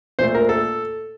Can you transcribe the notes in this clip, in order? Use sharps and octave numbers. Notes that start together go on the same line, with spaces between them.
A#2 A3 C5
A#4
A4